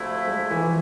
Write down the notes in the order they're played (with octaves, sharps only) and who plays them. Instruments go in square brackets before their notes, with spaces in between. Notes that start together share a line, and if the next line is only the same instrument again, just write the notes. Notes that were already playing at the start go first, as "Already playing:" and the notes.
Already playing: [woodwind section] D2 C3 F3 A3 E4
[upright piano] G#3
E3
F3